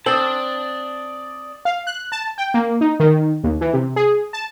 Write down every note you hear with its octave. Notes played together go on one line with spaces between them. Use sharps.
C4 C5 D5 A5 D#6 A6 F#7
F5
F#6
A5
G5
A#3
D#4
D#3
D#2
E3
C3
G#4
A5